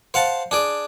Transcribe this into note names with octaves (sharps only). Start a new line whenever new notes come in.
C5 F5 F#5 A5
D4 G#4 D5